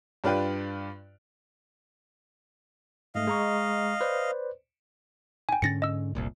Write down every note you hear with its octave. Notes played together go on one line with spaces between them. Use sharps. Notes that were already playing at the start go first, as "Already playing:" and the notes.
G2 D4 F4 B4 G5
G#2 A3 D#5 F5
G#3 A#5 C#6
B4 C5 D5
G5 G#5
G#2 D3 C#4 A6 A#6 C#7
D#5 E6
F1 C2 A#2